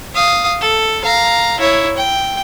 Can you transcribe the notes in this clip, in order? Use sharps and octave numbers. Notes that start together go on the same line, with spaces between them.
F5 D#6
A4
F5 A#5
E4 C#5
G5